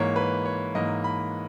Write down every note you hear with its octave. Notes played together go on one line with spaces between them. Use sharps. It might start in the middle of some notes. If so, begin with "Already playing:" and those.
Already playing: G#2 E3 A#3 C#5
B4
C#5
G#2 E3 A#3 D#5
B5